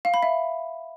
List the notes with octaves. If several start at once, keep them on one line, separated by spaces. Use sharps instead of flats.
F5
B5
E5